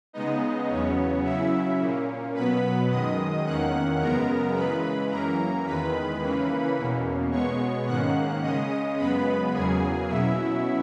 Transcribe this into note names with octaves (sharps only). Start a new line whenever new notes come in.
C#3 G#3 B3 D#4 D#5
E2 C#3 F#3 B3 C#4 C#5
C#3 F#3 C#4 E4 E5
A#2 A#3 C#4
B2 F#3 B3 B4 B5
F#2 D#3 G#3 D#5 D#6
E2 D#3 A#3 C#4 F#5 F#6
F#2 C#3 G#3 B3 A#4 A#5
C#3 E3 G#3 B4 B5
F#2 E3 A#3 C#4 A#4 A#5
E2 D#3 G#3 B4 B5
C#3 E3 A#3 C#4
E2 B2 A#3 C#4
B2 G#3 B3 C#5 C#6
G#2 D#3 A#3 C#4 F#5 F#6
C#3 G#3 C#4 D#5 D#6
F#2 C#3 G#3 B3 B4 B5
E2 C#3 F#3 A#3 G#4 G#5
B2 F#3 C#4 E4 E5